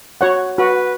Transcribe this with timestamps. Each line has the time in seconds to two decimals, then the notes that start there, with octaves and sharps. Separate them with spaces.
0.21 F#4 C#5 F#5
0.58 F#4 B4